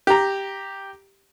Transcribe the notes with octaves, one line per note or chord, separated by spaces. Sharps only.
G4 A#5